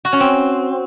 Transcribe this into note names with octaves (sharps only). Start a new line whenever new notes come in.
F#4
C#4
C4